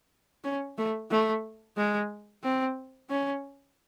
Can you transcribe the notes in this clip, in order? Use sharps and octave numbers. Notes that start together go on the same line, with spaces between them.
C#4
A3
A3
G#3
C4
C#4